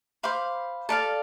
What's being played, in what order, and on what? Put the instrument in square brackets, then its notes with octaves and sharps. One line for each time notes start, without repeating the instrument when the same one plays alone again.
[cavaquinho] C5 F5 B5 D6
A4 D5 F5